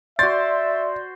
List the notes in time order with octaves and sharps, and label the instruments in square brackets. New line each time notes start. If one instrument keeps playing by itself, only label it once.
[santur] F#4 C5 [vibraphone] D5 C6 [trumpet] E5 [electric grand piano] A6